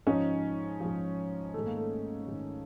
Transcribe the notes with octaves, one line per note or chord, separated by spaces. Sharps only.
G#2 F3 C#4 D#4
G#2 F3
G#2 D#3 A3
A#3
A3
G#2 D#3